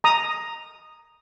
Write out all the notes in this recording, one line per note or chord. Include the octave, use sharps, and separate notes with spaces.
A#5 D#6